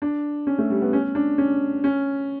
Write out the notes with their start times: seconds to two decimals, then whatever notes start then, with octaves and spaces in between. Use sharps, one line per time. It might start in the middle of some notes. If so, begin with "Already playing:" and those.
0.02 D4
0.47 C#4
0.58 A3
0.70 G3
0.82 B3
0.93 C#4
1.15 D4
1.38 C#4
1.84 C#4